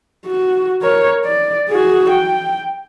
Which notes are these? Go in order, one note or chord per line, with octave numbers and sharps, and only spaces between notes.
F#4
A#4 C#5
D5
F#4 G#4
G5